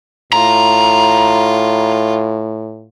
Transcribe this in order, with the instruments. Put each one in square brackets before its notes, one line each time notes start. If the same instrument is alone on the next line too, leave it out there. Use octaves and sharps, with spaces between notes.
[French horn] A2 [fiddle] F4 [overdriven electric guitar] A#5